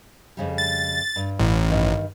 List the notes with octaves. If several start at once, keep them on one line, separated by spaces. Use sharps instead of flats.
F2 C#3 G3
A6
G2
A1
G2 D#3